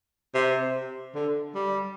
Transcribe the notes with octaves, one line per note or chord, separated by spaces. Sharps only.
C3
D3
G3